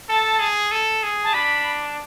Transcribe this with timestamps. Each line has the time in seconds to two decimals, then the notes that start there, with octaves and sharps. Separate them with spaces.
0.09 A4 A5
0.40 G#4
0.71 A4
1.03 G#4
1.24 A5
1.34 D4 B5